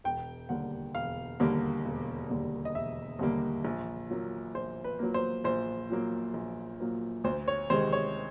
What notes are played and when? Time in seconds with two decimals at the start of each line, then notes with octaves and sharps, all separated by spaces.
0.04 E1 G5
0.49 D#2 D3 G3 A#3 F#5
0.94 E1 F5
1.40 D#2 D3 G3 A#3
1.85 E1
2.29 D#2 D3 G3 A#3
2.65 D#5
2.75 E1 E5
3.19 D#2 D3 G3 A#3
3.65 A#1
4.10 A#2 F#3 A#3
4.55 A#1 C5
4.84 B4
4.99 A#2 F#3 A#3
5.14 C5
5.44 A#1 C5
5.90 A#2 F#3 A#3
6.34 A#1
6.80 A#2 F#3 A#3
7.24 D2 C5
7.48 C#5
7.70 C3 D#3 G#3 C5
7.93 C#5